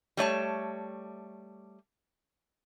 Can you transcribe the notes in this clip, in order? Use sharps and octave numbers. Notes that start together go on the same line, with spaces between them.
G3 A3 C#5 A5